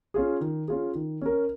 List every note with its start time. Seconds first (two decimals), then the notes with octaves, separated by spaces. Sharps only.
0.14 C#4 F4 G#4
0.41 D#3
0.68 C#4 F4 G#4
0.95 D#3
1.22 C#4 A#4